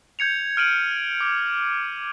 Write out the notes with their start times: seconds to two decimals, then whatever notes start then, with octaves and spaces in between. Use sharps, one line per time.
0.19 G6 G#6 C#7 F7
0.57 F6 D7 D#7 F#7
1.21 D6